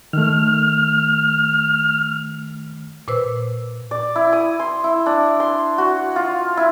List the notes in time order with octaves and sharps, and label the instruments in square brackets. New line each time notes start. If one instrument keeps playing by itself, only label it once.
[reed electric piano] D#3 A3 [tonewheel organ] F6
[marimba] A#2 B4 C5 E6
[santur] D5
E4
D#6
C6
E4
D4
C6
F#4
F4
E4